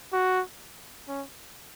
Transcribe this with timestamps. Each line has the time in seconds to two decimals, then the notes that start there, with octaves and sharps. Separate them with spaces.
0.12 F#4
1.08 C#4